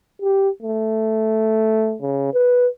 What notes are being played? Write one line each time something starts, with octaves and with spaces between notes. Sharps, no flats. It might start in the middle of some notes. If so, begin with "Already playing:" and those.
G4
A3
C#3
B4